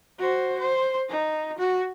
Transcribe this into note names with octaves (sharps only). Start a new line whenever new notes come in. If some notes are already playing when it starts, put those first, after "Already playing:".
F#4 C5
C5
D#4
F#4